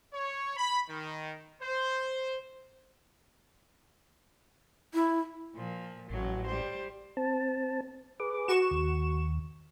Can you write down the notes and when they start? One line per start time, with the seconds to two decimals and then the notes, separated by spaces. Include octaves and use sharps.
0.13 C#5
0.57 B5
0.89 D#3
1.61 C5
4.94 E4
5.54 A#2 F3
6.10 A1 F#3
6.47 G3 C5
7.17 C4 A5
8.20 G#4 B4 D6
8.48 F#4 C#6 E7
8.71 D#2